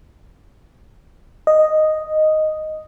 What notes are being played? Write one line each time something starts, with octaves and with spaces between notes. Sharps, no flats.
D#5